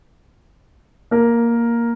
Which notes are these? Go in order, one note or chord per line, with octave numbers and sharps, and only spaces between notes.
A#3 A#4